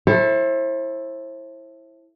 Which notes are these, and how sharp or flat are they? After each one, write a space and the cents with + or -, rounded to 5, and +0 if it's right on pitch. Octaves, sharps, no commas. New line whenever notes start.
E4 +0 A4 +0 C5 +40